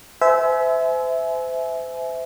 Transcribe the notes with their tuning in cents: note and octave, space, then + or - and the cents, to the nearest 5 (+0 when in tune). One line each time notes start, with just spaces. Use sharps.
C5 -35 E5 -10 G#5 +30